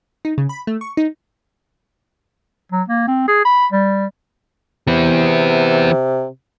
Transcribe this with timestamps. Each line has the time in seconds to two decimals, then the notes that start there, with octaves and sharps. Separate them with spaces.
0.25 D#4
0.38 C#3
0.49 B5
0.67 A3
0.81 C#6
0.97 D#4
2.72 F#3
2.88 A#3
3.08 C4
3.28 G#4
3.45 B5
3.72 G3
4.87 C3 E3 B3